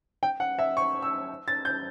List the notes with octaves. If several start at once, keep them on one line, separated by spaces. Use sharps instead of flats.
G5
F#5
E5
C#6
E6
A6
G6